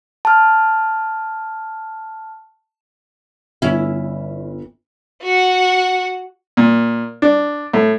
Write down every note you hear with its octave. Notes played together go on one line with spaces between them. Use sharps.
A5 F6
G1 C#4 E4
F#4 F#5
A#2
D4
A2